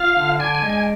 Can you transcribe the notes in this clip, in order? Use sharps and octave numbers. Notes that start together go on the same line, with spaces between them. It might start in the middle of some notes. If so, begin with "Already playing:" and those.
Already playing: F4 F5
D3
D4 G#5
G#5
G#3
G#5